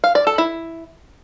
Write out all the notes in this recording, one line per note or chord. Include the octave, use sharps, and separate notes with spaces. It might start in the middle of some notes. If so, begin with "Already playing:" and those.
F5
D5
A4
E4